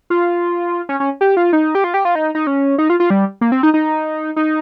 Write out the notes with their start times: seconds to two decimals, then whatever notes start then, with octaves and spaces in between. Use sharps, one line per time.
0.10 F4
0.89 C#4
1.00 C#4
1.21 G4
1.37 F4
1.53 D#4
1.75 G4
1.84 F4
1.94 G4
2.05 F4
2.15 D#4
2.35 D#4
2.47 C#4
2.78 D#4
2.90 F4
3.00 F4
3.10 G3
3.41 A#3
3.52 C4
3.63 D#4
3.74 D#4
4.36 D#4